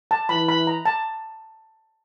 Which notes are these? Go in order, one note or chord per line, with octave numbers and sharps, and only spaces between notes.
A5
E3 B5
B5
A#5
A5